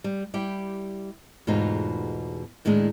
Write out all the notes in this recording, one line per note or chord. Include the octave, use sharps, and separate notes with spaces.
G3
G3 E4 G4
E2 G#2 B2 A3 D#4 F4
D#2 A2 D#3 G#3 D4